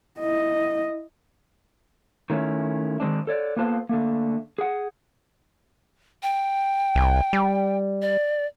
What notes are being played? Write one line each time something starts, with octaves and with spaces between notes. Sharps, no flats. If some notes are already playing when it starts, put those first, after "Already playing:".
E4 D#5
D#3 A3 C#4 E4
D#3 G#3 C4 D4
A4 C#5 D5
A#3 B3 F4 A4 C5
D3 A3 A#3
G#4 F#5
G5
C2
G3
D5